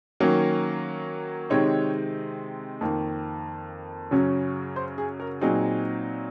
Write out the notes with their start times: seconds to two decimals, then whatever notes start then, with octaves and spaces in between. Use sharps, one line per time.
0.20 D#3 F#3 A#3 C#4 A#4
1.50 C3 D#3 G#3 C4 D#4 C#5
2.81 F2 D#3 A#3
4.11 F#2 C#3 F#3 C#4
4.76 C5
4.98 G#4
5.20 A#4
5.41 A#2 F#3 C4 D#4 G#4